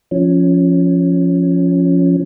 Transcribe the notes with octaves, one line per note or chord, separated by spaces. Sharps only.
F3 C#4